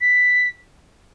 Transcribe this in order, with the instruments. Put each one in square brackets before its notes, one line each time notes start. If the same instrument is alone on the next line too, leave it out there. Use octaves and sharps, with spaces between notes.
[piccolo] B6